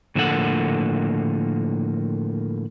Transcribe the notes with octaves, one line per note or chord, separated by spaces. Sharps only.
A2 D3 F3 A#3 A4 F#5